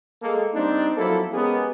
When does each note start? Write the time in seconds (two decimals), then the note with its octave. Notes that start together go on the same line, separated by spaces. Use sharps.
0.23 G#3 A#3 A4
0.54 G3 C4 D4 D#4
0.97 F3 F#3 A#3 E4 A4
1.33 G#3 B3 C#4 G4 G#4 A#4